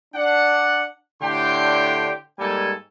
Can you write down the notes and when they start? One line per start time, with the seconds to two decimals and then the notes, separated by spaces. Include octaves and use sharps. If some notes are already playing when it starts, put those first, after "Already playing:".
0.14 D4 F#5
1.22 A2 D3 D4 G4 G5 C6
2.39 G#2 G3 A#3 A4 G#5